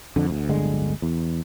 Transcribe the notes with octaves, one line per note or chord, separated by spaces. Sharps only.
F2 D3
D2
D1 G1 D3 G#3
E2